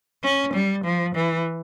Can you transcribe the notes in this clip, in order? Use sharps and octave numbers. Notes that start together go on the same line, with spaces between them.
C#4
G3
F3
E3